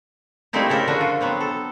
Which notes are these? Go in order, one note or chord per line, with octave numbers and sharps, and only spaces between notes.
G3 A3 A#3 C4 D#4 E4
C#3 A4 A#4
D3 F3 D4 F#4
F4
F#3 B3 C4
A4